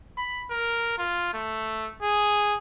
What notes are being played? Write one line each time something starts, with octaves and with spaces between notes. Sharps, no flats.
B5
A#4
F4
A3
G#4